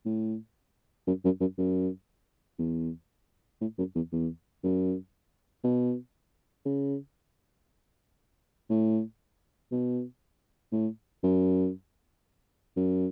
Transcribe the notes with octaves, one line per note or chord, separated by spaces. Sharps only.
A2
F#2
F#2
F#2
F#2
E2
A2
F#2
E2
E2
F#2
B2
C#3
A2
B2
A2
F#2
F#2